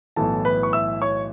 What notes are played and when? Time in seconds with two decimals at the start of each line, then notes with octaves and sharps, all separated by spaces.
0.16 B1 A2 E3 A4 A5
0.45 B4 B5
0.63 C#6
0.73 E5 E6
1.02 C#5 C#6